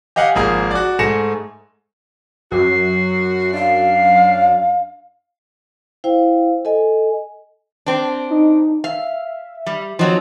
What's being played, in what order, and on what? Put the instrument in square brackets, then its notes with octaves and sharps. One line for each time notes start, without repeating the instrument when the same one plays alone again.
[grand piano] G4 D#5 F5 F#5 G#5
G#1 F3 A#3 G#4 D#6
F#4 D5
G#2 A3 G#5 A#6 C#7 E7
[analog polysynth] F#2 [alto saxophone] F#4 [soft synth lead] C7
[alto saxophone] D4 [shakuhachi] F5
[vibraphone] E4 C5 F5 G5
A4 D#5 G#5
[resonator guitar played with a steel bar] C4 D4
[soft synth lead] D#4
[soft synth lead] E5 [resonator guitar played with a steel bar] F5
[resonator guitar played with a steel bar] G3
[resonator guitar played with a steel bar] F3 F#3 C4 [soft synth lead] D#4